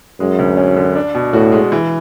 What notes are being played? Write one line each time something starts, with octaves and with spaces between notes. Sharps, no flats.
F#2 G#3
D2
C#4
D3
D4
B2
A2 F#4
G#3
E3